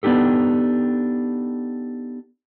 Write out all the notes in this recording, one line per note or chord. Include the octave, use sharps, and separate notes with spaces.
B3 D4 D#4 G4 A4